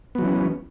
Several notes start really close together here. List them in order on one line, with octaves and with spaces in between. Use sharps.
B3 F#3 E3 C#4